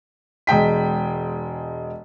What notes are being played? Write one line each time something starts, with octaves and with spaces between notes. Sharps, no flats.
E1 G#3 G5 B6